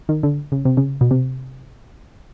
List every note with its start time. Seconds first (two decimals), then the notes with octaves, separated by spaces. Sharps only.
0.09 D#3
0.23 D3
0.52 C#3
0.65 C3
0.77 C#3
1.01 B2
1.11 C3